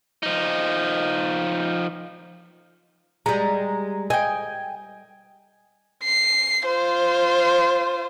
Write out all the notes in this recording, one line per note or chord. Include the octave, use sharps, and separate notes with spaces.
F3 D#4
G3 G#3 A#5
D#5 G5 G#5
C7
F4 C5